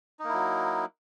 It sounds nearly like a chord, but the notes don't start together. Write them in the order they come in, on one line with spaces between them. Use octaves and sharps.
D#4 A#3 E4 F#3